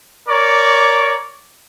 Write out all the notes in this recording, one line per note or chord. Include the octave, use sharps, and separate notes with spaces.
A#4 C#5 D5 C#6 D6